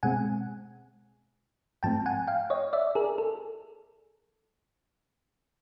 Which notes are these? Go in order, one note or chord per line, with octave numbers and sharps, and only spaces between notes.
B2 G#3 C4 F#5 G#5
G#2 F3 A3 C4 G5 A5
F#5 G#5
F5 G5
C#5 D#5
D5 E5
G#4 A#4
A4